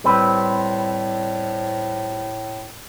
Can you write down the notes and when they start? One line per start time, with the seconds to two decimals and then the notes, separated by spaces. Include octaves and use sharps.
0.04 A2 G3 C4 B4